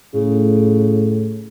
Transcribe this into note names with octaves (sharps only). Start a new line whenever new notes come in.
A2 C#3